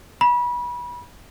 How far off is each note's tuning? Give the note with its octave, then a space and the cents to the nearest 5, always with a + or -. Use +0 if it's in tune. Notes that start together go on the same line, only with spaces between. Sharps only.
B5 -30